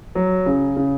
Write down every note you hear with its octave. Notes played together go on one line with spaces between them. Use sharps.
F#3
C#3
C#3